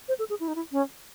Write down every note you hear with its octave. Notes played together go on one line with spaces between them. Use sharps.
C5
A4
G#4
E4
D#4
E4
C#4